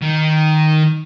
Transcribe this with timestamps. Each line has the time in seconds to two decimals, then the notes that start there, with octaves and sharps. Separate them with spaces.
0.02 D#3